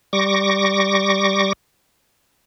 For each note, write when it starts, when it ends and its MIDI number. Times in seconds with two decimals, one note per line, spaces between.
0.13 1.53 55
0.13 1.53 85
0.13 1.53 86
0.13 1.53 94